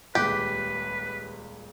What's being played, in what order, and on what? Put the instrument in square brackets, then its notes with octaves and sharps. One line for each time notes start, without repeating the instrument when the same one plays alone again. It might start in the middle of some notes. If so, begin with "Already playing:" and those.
[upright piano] D#1 C#2 F#6 [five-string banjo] G4 [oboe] B4